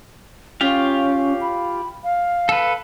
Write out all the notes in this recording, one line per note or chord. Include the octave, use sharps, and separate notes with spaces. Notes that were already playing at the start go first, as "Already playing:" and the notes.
C#4 F4 G4 F5
B5
F5
A4 B4